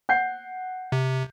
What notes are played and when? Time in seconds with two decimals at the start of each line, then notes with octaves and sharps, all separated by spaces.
0.09 F#5 G6 C7
0.92 C3